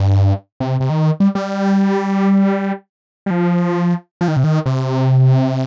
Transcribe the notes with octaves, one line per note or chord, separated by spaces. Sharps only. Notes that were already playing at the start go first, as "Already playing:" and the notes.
Already playing: G2
C3
C3
D#3
G3
G3
G3
F3
F3
D#3
C3
D#3
C3